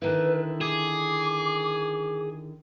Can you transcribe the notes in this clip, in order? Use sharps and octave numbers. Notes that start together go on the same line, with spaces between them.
D3 D#3 E4 B4
G#4 D6